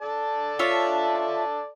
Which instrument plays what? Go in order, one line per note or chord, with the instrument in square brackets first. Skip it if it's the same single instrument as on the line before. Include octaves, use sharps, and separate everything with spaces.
[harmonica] A4 D5 A5
[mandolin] F4 C#5 E5